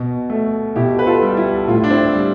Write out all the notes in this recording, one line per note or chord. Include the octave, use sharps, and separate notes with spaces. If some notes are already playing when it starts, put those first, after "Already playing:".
Already playing: B2
A3
B2 E4 G4
B4
F4 A4
G3
E4 G4
A2 F4
E4
D4
C4 E4
G3